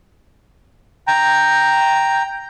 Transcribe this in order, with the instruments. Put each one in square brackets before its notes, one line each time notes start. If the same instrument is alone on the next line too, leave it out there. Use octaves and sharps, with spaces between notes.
[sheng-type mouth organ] G5 A#5